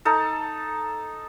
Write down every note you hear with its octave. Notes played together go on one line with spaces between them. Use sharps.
D#4 A4